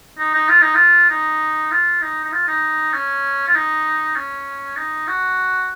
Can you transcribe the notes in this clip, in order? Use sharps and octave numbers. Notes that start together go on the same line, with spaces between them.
D#4
D#4
F4
D#4
F4
D#4
F4
D#4
D#4
F4
D#4
C#4
F4
D#4
C#4
D#4
F#4